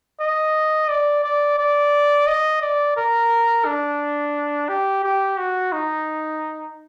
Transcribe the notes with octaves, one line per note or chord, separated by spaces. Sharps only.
D#5
D5
D5
D5
D#5
D5
A#4
D4
G4
G4
F#4
D#4